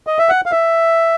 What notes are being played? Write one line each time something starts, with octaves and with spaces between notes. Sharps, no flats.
D#5
E5
F#5
F5
E5